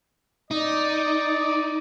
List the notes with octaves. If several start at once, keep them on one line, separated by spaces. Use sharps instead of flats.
D#4 D5